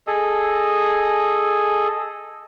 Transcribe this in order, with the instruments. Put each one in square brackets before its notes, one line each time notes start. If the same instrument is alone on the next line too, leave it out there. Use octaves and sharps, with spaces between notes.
[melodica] G#4 A4 D#5